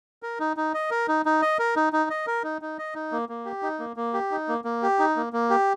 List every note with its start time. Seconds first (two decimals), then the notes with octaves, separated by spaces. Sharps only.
0.23 A#4
0.40 D#4
0.57 D#4
0.74 D#5
0.91 A#4
1.08 D#4
1.26 D#4
1.42 D#5
1.59 A#4
1.76 D#4
1.93 D#4
2.10 D#5
2.27 A#4
2.44 D#4
2.62 D#4
2.78 D#5
2.95 D#4
3.12 A#3
3.29 A#3
3.45 G4
3.63 D#4
3.80 A#3
3.96 A#3
4.14 G4
4.31 D#4
4.49 A#3
4.64 A#3
4.82 G4
4.99 D#4
5.16 A#3
5.33 A#3
5.50 G4